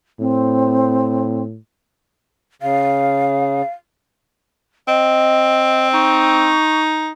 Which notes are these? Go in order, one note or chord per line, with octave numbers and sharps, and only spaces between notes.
A2 C4
C#3 F5
C4 D#5
D#4 C#6